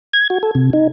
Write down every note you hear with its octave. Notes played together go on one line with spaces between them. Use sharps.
G#6
F#4
A4
C3
D#4